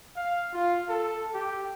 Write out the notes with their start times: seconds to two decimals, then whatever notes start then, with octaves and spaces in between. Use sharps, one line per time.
0.17 F5
0.53 F4
0.89 A4
1.34 G4